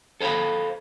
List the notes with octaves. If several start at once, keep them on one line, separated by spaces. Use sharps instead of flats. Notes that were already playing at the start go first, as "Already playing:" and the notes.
A4 C5 E5 F5 B5